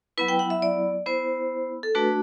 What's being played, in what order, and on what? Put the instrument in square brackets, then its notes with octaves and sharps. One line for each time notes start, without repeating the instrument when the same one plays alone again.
[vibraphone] F#3 B3 E4 B4
G5
F#5
E5
D5
B3 E4 C5
A4
A3 D4 F#4 B4